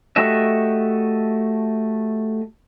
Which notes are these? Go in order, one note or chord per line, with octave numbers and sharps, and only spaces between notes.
A3 F#4 G4 D#5 E5